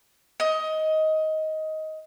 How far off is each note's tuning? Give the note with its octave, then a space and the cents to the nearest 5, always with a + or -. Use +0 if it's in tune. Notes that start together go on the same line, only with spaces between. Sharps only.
D#5 +15